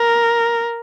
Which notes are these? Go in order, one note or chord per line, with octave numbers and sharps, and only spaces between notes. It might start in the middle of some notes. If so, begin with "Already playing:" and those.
Already playing: A#4